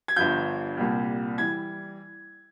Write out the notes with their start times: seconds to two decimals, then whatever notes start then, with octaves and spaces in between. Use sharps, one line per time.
0.08 G#6
0.16 G1 G2 F3 G6
0.77 C2 A#2 G3
1.38 E3 G3 G#6